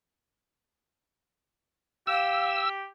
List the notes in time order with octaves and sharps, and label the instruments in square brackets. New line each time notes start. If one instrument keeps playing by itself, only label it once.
[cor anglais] G4 [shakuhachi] F5 [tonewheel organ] E6